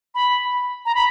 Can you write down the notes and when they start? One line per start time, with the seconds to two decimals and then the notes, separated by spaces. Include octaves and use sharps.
0.15 B5
0.86 A#5
0.95 B5